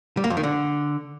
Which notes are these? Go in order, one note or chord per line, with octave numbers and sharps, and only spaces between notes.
G3
A#3
F2
D#3
D3